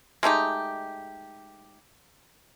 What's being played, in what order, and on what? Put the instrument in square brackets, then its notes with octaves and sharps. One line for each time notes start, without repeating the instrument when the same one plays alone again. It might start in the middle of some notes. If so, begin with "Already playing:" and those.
[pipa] G#3 A3 D#4 G4